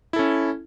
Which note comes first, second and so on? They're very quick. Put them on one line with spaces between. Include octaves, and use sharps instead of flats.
E4 A4 C#4